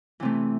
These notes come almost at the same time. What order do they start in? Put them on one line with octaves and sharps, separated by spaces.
E3 C3 A3